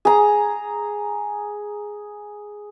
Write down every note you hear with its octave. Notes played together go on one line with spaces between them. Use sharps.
G#4 A#5